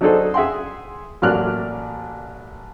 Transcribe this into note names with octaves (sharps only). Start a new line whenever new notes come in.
F#3 D4 D#4 G#4 A4 C5
G#4 E5 F#5 G5 C6
A1 F#3 A#3 D5 F6 F#6